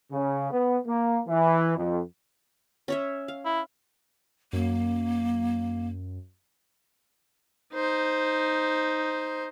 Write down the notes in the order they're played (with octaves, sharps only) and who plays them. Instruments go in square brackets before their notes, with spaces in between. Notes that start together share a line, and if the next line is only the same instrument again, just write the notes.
[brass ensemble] C#3
B3
A#3
E3
F2
[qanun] C#4 C#5 E5
F5
[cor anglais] E4
[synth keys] F#2 [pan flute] A#3
[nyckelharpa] D#4 C5